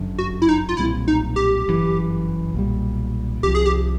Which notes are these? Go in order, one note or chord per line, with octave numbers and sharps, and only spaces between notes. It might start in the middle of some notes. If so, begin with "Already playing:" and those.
Already playing: G1 F#2 D3
F#4
E4
D#4
F4
B1 A#2 G3 C4 E4
D#4
G4
G1 F#2 C#3 E3
B1 A#2 G3
C2 C3 F3 G4
G#4
G4